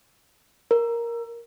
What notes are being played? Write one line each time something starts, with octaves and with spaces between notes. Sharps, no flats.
A#4